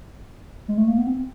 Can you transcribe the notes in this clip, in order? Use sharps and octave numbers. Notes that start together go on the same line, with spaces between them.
G#3
A3
A#3
B3
C4